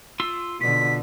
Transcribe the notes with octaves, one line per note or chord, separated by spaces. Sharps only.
F4 C6 E6
B2 D3 F4 B6